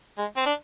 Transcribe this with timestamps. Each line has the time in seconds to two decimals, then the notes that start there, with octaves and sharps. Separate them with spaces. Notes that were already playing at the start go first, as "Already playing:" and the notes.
0.18 G#3
0.37 C4
0.46 D4